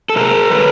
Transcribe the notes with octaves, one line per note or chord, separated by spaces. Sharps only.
A4
C3 G#4 A#4
D#3 G3 A4 B4